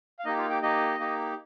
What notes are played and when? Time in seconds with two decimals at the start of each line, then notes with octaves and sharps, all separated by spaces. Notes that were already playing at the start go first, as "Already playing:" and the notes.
0.19 F5
0.25 A#3 D#4 G4 D#5
0.38 F4 F5
0.50 G4 G5
0.62 A#3 D#4 G4 D#5
0.99 A#3 D#4 G4